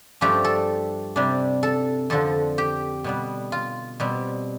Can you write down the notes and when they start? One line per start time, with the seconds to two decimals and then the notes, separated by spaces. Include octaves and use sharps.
0.21 G2 F3 A3 D4 G4
0.44 A4
1.16 C3 G3 D4
1.63 A4
2.10 F2 D3 F3 A4
2.58 G4
3.04 B2 G3 B3
3.52 F4
4.00 B2 G3 C4